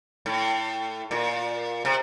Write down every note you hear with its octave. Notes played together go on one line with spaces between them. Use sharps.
A2
A#2
C3